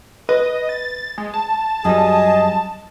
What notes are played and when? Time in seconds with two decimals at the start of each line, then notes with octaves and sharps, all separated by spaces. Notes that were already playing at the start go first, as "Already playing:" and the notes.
0.29 B4 D#5
0.69 A6
1.18 G#3
1.34 A5
1.85 F#2 G3 G#4 D#5